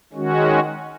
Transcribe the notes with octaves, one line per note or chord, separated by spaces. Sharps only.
D#3 G#3 C#4 F#4